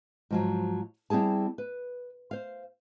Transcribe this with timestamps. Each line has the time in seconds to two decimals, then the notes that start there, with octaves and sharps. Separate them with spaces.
0.31 G#2 F3 F#3
1.10 G3 C4 E4 G#4 A5
1.58 B4
2.31 C5 F5